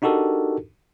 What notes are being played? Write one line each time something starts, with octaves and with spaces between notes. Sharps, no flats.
D4 D#4 F#4 G4 A4 A#4